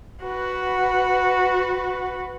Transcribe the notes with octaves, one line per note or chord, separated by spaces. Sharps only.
F#4 B4